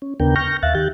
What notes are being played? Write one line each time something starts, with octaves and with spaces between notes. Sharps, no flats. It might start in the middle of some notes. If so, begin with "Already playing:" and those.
C#4
D#2 C#3 B3 D4 A#4 G5
C#6 F6 G6 A#6
D#2 E5 F5 F#6 A6
D#3 G4 F#6 G6 A6